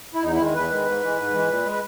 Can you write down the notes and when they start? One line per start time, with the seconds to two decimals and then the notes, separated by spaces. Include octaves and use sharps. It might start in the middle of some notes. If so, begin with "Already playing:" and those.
0.14 E4
0.23 E2 D#4
0.33 E4
0.39 D#3 G#3
0.54 E2 B4
0.70 D#3 G#3
0.86 G#2
1.01 E3 G#3
1.18 G#2
1.33 E3 G#3
1.48 A#2
1.65 G#3
1.72 B4